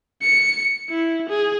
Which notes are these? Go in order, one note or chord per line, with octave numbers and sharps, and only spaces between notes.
C#7
E4
G#4